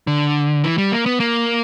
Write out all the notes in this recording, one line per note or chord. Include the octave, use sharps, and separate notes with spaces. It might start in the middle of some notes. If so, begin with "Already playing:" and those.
D3
E3
G3
A#3
B3
A#3